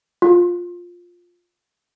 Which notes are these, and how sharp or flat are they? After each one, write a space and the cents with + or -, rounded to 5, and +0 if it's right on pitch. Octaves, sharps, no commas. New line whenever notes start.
F4 +10